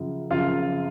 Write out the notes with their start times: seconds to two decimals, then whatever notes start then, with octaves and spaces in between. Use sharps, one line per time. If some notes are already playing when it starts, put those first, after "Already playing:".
Already playing: F#2 C#3 F3
0.31 F#2 C#3 F3 F4 F5